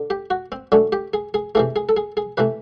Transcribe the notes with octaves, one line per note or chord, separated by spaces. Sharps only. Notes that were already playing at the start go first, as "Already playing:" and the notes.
Already playing: D3
G4
F#4
C4
D3 F#3 A3 C#4
G4
G#4
G#4
C3 E3 A3 G#4
G#4
A4
G#4
G#4
C3 E3 A3 B4